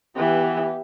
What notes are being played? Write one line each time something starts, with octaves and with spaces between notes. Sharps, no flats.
E3 B3 G4